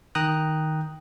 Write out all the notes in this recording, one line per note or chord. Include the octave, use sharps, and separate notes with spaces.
D#3 G5 A#5 D#6 F#6